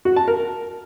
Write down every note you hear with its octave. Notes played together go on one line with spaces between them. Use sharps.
F#4
A5
A#4